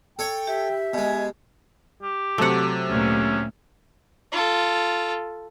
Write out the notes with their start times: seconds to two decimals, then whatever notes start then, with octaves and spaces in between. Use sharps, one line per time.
0.19 A4 C#5 G5 C#6
0.47 G4 E5
0.94 B2 G#3 G#5
2.03 G4
2.38 C3 F#3 A3 F#5
2.90 D2 A#2 C#4
4.32 F4 A4